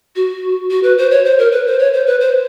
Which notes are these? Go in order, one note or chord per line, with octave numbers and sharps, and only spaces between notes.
F#4
F#4
B4
C5
C#5
C5
A#4
B4
C5
C#5
C5
B4
C5